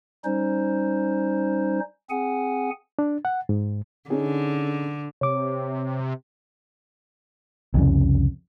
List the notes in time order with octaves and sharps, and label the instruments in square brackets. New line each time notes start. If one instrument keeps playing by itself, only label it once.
[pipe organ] G3 C#4 D#4 C5
C4 G#4 F#5 G#5
[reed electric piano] D4
F#5
G#2
[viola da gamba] D3 [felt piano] C#4 D#4 G#4
[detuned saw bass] C3 [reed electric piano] C#5 D6
[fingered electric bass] C2 F2 C#3